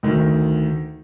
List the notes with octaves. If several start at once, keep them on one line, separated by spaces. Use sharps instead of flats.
D2 D#3